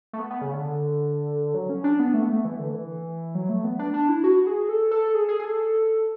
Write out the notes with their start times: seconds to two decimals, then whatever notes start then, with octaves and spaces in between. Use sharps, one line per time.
0.13 A3
0.19 B3
0.30 B3
0.41 C#3
0.53 D3
1.54 F#3
1.70 C#4
1.84 D4
1.99 B3
2.14 A3
2.22 B3
2.29 A3
2.45 E3
2.59 D3
2.74 E3
3.35 F#3
3.49 A3
3.64 B3
3.79 D4
3.94 D4
4.09 E4
4.24 F#4
4.47 G#4
4.69 A4
4.91 A4
5.14 G#4
5.29 G#4
5.40 G#4
5.45 A4